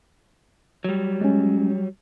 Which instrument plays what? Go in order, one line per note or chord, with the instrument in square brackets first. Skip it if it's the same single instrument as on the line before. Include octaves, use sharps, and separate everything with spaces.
[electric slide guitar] F#3 G3
[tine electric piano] G#3 C#4